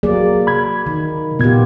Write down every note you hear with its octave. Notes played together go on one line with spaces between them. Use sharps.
F#3 A#3 G#4 D5
B5 G#6
D#3
A#2 B3 F4 G4 G#6